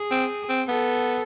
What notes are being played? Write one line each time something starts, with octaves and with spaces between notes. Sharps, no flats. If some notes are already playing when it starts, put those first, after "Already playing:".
Already playing: G#4
C4
C4
B3 A4